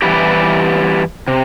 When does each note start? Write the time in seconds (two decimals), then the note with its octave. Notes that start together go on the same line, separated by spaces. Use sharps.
0.02 E3 G3 B3 E4 G4
1.28 C3